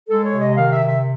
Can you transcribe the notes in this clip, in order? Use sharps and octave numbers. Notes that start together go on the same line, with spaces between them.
G#3 A4
C#5
C3
D#5
D#3 F5
E5
C3
E5